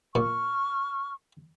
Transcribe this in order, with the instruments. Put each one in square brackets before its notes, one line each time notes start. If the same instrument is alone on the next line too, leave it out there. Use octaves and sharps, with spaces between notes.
[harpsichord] A#2 [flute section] C#6 F6